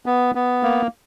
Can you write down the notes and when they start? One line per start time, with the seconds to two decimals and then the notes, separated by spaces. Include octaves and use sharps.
0.06 B3
0.35 B3
0.63 A#3